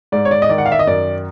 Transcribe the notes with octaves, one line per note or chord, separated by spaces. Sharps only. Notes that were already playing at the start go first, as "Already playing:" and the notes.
G#2 D5
C#5
D5
D#5
D#3 D5
F#5
F5
E5
D#5
F#2 D5